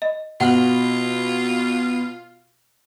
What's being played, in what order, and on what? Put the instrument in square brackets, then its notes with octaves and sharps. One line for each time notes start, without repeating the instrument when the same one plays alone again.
[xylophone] D#5
[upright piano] B2 F#4 [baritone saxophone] F4 [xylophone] F#5 F6 F#7